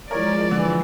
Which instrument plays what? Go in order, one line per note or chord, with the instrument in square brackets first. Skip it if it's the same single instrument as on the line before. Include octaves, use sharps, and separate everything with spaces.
[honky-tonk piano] E3 A#4 [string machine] F3 G#3 [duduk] C#5 [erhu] D5
[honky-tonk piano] D3 [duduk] E3